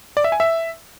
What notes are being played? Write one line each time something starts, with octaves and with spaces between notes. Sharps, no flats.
D5
E5
G#5
E5